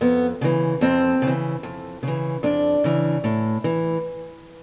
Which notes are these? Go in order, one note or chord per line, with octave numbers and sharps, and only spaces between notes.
F2 B3
C#3 E3
F2 C4
C#3 E3
F2
C#3 E3
F2 D4
C#3 E3
A2
E3